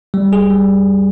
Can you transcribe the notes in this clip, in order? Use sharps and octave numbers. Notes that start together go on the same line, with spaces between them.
G3
G#4
G3